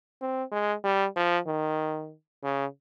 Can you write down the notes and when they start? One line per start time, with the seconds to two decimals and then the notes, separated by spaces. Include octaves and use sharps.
0.21 C4
0.52 G#3
0.84 G3
1.16 F3
1.47 D#3
2.43 C#3